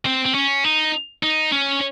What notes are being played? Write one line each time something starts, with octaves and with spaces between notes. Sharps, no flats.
C4
C4
C#4
D#4
D#4
C#4